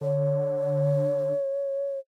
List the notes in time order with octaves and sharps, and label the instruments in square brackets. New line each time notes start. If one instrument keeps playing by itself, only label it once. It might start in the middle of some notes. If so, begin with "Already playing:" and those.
[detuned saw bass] D3 [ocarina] C#5